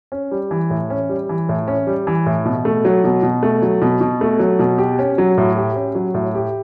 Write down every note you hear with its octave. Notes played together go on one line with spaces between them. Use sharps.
C#4
G3
E3
A2
C#4
G3
E3
A2
C#4
G3
E3
A2
B2
A3
F#3
B2
B2
A3
F#3
B2
B2
A3
F#3
B2
G4
C#4
F#3
A2
G4
C#4
F#3
A2
G4